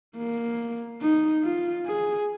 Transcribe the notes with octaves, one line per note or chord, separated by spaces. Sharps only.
A#3
D#4
F4
G#4